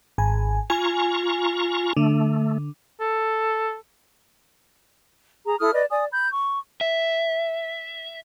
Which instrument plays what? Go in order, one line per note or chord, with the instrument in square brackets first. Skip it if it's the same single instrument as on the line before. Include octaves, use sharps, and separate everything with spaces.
[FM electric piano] G#1 G#5
[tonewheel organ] F4 A#5 C#6 [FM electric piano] G#5
[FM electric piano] D3 [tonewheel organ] A3
[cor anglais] A4
[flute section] G#4 A#5
E4 A4 D#6 F6
B4 D5 D#5
D5 G#5 D#6
B5 G6
C#6
[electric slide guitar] E5